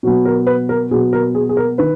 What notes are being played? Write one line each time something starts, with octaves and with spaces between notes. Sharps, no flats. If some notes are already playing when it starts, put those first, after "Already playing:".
B2 F#3 B3
A#4
B4
A#4
B2 F#3 B3 G#4
A#4
G#4
G#4
A#4
D#3 B4